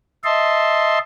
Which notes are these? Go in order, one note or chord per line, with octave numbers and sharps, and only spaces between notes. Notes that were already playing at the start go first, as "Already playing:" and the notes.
D#5 E5 A5 C6